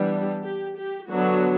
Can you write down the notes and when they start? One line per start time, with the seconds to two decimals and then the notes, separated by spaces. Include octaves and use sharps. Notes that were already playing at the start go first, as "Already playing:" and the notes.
Already playing: E3 G3 B3 D4 G4
0.45 G4
0.79 G4
1.11 D3 F#3 B3 D4 F#4